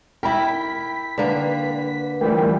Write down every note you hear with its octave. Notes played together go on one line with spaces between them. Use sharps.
E4 A#4 G5 B5 B6
D3 A#3 B4
E3 F3 G3 A3 A#4 G5